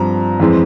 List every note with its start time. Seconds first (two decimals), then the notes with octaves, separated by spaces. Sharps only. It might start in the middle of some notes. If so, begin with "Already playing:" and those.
Already playing: G2 F3 C4 A#5
0.40 F2 E3 G#3 C4